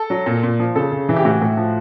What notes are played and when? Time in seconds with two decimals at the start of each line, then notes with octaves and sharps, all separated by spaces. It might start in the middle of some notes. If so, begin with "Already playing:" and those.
Already playing: A4
0.10 F#3
0.26 A#2
0.43 A#2
0.59 F3
0.75 C#3 A4
0.92 C#3
1.09 E3
1.16 G4
1.25 A2 F#4
1.41 A2
1.57 F3